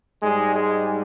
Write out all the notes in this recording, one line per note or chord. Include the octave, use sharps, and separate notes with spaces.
G#2 G3 G#3
G#3